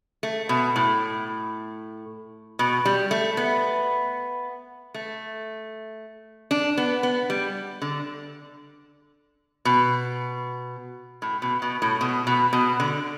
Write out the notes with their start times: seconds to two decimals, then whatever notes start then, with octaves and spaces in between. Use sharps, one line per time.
0.23 A3
0.49 B2
0.76 A2
2.59 B2
2.85 G3
3.11 A3
3.37 B3
4.94 A3
6.51 D4
6.78 B3
7.03 B3
7.30 G3
7.82 D3
9.65 B2
11.22 A2
11.42 B2
11.62 B2
11.82 A2
12.01 B2
12.27 B2
12.53 B2
12.80 D3